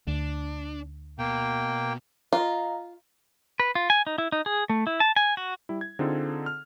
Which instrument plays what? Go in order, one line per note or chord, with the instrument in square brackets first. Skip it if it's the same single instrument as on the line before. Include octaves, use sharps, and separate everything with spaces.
[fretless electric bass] D2 [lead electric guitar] D4
[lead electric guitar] B2 [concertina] A#3 G5
[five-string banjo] F4 [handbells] D#5 F5 A#5
[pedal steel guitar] B4
F4
G#5
D#4
E4
D#4
G#4
A3
E4
A5
G#5
F#4
[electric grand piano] G3 E4
G#6
D3 C4 D#4 F4 G#4 A4
F6